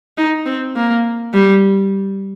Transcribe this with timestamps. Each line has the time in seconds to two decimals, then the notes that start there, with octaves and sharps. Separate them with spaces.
0.18 D#4
0.46 C4
0.76 A#3
1.34 G3